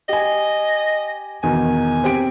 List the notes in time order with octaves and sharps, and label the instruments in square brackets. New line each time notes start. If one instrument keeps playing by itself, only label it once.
[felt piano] G4 G#5 [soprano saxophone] D#5
[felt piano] E2 B2 D#3 [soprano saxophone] G#5
[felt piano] C4 G4 D7